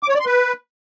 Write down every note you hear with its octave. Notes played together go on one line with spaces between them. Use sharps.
D6
C#5
D5
C6
B4